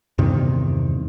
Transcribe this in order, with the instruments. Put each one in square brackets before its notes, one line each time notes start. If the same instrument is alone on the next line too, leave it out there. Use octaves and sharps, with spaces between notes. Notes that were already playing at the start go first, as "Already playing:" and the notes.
[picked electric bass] E2 G2 C3 D#3